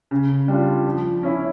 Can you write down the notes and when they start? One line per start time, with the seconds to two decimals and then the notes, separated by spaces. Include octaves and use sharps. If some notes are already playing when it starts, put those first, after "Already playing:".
0.11 C#3
0.48 G3 D4 F4
0.86 F3
1.23 C#4 E4